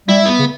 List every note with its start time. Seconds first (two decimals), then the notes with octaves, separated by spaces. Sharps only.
0.08 G3 E4
0.26 B3
0.39 C#3